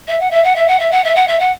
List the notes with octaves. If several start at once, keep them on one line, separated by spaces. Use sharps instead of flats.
E5
F#5
E5
F#5
E5
F#5
E5
F#5
E5
F#5
E5
F#5